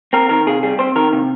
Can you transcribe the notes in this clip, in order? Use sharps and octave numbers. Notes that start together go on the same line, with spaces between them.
C4 A#4
D#3 A#4
C3 G#4
G3 G#4
C4 C5
D#3 A#4
C3